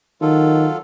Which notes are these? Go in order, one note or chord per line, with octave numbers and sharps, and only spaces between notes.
D#3 F#3 F4 A4